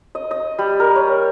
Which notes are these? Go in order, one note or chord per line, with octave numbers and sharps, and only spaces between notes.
D#5
D#5
G3
A#4
C#5